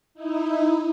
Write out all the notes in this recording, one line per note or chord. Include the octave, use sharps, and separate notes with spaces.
D#4 E4